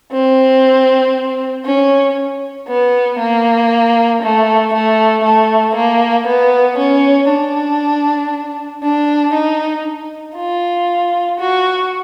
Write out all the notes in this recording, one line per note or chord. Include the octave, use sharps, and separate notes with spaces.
C4
C#4
B3
A#3
A3
A3
A3
A#3
B3
C#4
D4
D4
D#4
F4
F#4